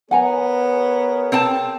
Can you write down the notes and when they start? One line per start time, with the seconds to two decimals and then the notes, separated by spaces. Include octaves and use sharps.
0.11 B3 G#4 A#4 C#5 F#5 G#5 A#5
1.32 C4 G5 A5